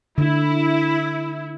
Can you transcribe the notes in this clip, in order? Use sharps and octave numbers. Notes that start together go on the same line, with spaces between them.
D3 E4